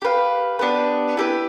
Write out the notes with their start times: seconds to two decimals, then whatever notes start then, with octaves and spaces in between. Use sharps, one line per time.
0.02 G4 B4 F5
0.59 B3 D4 G4 B4
1.17 E4 G4 B4